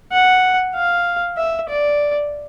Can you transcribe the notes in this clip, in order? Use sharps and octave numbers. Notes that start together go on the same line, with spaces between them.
F#5
F5
E5
D5